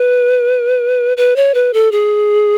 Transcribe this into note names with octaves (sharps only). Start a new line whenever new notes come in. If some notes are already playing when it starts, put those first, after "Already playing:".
Already playing: B4
B4
C#5
B4
A4
G#4